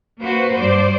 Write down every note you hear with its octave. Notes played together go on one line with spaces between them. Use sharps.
A#3 F#4 B4 C5
G2 C5 D5